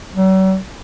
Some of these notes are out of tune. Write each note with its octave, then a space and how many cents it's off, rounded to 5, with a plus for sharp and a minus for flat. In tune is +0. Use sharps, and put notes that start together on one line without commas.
F#3 +45